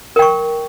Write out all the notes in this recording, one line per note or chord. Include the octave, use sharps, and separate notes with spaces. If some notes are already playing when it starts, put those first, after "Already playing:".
A#4 G5 C#6